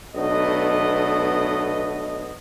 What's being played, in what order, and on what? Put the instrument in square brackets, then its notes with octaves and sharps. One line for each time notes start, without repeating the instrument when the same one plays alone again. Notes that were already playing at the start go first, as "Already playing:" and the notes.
[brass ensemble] B1 A3 B3 D4 D#5